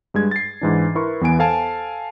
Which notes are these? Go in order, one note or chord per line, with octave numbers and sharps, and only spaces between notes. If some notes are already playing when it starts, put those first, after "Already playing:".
G2 G#3 G#6
A6 C7
G#2 E3 D4
E4 A#4 B4 C6 C#6
E2 E3 B3 B4 G#5 D7
A4 C5 F5 G#5 A5